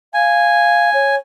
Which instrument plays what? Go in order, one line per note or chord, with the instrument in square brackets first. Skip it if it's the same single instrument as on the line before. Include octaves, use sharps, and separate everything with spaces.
[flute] F5 [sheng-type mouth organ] G#5
[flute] C#5